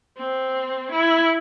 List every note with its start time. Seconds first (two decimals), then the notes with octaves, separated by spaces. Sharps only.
0.18 C4
0.92 E4